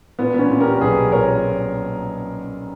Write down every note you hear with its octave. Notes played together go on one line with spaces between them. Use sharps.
A#2 B3
B3
C#4
A#2
G4 A#4
B1 G#4 B4
A#2 A#4 C#5